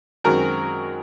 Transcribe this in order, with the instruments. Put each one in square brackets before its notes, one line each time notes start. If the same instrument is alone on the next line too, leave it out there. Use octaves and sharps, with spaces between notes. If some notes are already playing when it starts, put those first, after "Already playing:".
[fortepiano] F#2 D#3 G#3 C4 F#4 A#4